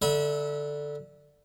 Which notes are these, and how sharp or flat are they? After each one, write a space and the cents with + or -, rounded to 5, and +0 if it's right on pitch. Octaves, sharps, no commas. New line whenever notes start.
D3 +0 E5 -30 B5 -30